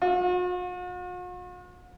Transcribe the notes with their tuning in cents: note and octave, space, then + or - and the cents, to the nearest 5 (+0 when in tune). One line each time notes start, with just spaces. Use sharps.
F#4 -45